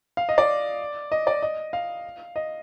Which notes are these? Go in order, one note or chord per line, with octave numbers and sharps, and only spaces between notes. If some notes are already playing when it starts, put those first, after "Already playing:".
F5
D#5
D5
D#5
D5
D#5
F5
D#5